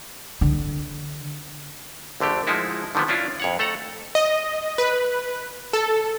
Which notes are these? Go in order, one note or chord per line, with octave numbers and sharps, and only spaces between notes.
D3
A#1 D3 A3 G4
F3 G#3 D#4 E4 F#4
D3 D#3 F3 G3 B3
C#4 D4 E4 F4
F2 C#5 F#5
A3 A4 F#5 A#5
D#5
B4
A4